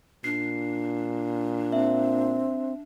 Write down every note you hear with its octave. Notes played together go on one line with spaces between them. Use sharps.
A#2 D4 C7
C4 E5